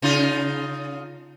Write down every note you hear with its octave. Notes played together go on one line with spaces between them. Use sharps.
C#3 D#4 F4